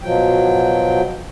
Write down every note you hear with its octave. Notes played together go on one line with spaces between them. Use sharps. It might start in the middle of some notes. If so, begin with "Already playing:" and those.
B2 F3 F#3 G5